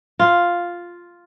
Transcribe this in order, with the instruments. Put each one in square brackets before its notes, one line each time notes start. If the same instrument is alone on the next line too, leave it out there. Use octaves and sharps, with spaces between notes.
[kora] F4